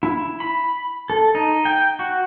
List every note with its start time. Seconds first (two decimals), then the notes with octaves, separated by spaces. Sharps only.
0.03 E4
0.40 B5
1.10 A4
1.35 D#4
1.65 G5
1.99 F#4